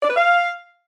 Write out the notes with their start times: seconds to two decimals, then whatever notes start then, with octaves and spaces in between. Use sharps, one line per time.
0.02 D5
0.09 B4
0.15 F5